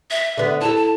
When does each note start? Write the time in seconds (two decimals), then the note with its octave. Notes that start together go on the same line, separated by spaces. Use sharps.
0.11 E5
0.37 D3 B3
0.61 E4 A4 A5
0.76 A5